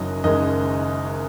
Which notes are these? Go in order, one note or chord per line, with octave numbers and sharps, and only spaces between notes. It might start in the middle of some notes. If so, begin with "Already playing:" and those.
Already playing: F#1 F#2 D#3 F#3 D#5
F#1 F#2 D#3 G#3 D#5